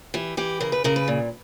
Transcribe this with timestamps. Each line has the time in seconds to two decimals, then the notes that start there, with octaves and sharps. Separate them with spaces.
0.14 E3 G4
0.37 E3 G4
0.60 C#3 A#4
0.72 B4
0.84 C#3 A#4
0.96 B4
1.08 A#2